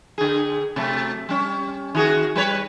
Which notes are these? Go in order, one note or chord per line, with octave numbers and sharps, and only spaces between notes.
D3 G#4
C3 F#3 A3
G3 C#4
D#3 F#4 G#4
G3 B4 C#5